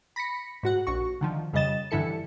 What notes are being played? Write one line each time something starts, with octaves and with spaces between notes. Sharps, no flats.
B5 A#6 B6 C#7
G#2 F#4 F#5
A#1 F#4 C#6
D3 D#3 F3
F2 C#3 G3 D#5 A6 E7
G2 D3 E3 E4 A4 C#7